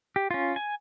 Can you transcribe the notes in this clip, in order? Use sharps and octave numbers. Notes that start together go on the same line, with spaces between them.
G4
C#4 F4
G#5